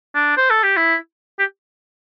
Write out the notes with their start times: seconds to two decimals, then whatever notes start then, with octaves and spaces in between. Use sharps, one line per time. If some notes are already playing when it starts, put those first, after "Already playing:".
0.15 D4
0.37 C5
0.50 A4
0.63 G4
0.77 E4
1.39 G4